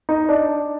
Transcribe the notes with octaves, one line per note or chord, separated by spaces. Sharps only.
D#4
D4